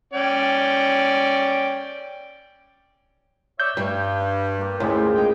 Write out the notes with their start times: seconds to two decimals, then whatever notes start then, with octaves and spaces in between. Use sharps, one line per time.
0.14 C#4 D5 G5
3.60 C#5 D5 E5 G6
3.77 G2 G3 C#5 G5
4.61 A#3 G4
4.80 D2 A2 C#3 G#3 F4
5.14 G#3 D#4 G5